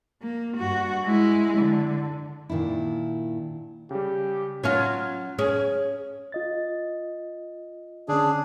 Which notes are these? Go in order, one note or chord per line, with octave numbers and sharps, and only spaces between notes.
A#3
G2 F#4
G#3 E4
D3
A#2 D#3 D4 E4
C#3 G3 G4
F#3 C#4 F4
C#4 G#4
F4 D#5 A6
D3 C#4 D4 G#4